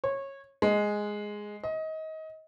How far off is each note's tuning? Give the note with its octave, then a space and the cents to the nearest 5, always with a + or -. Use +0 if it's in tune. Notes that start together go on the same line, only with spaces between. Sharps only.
C#5 -20
G#3 +0
D#5 +25